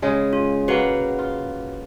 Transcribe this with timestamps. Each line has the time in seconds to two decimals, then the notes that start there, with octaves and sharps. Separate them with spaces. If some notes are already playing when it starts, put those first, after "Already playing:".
0.02 C#3 G#3 G#4
0.33 F4
0.68 A#3 F#4 B4 F#5
1.19 F4